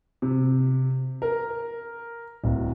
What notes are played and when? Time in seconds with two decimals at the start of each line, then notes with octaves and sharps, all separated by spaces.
0.22 C3
1.22 A#4
2.44 D1